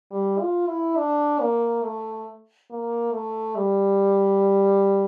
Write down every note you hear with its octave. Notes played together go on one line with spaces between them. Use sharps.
G3
F4
E4
D4
A#3
A3
A#3
A3
G3